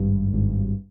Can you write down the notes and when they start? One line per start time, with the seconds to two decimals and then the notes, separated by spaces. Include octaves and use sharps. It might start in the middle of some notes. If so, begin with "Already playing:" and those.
Already playing: G#1 G2
0.33 G#1